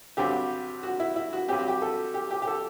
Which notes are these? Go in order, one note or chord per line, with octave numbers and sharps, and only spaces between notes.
G2 D3 F#3 C4 G4
F#4
E4
E4
F#4
G2 F#3 C4 G4
F#4
G4
A4
G4
G4
G4
A4